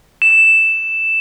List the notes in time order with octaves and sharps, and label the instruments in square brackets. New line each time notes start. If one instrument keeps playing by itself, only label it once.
[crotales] E7